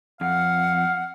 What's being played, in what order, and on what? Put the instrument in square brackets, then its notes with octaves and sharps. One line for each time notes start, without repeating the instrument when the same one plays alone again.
[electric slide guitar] F2 [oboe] F5 [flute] F#5